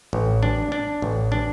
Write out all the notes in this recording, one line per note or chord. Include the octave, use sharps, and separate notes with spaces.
A1
D4
D4
A1
D4